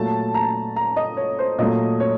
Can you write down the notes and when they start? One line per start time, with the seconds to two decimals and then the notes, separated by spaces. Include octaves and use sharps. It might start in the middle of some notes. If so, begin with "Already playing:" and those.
Already playing: A#2 F#3 A3 A5
0.34 A#5
0.76 A#5
0.97 D#5
1.17 C#5
1.39 C5
1.58 A#2 F#3 A3 D#5
2.00 C#5